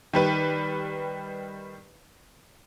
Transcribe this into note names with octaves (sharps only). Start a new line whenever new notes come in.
D#3 G3 B4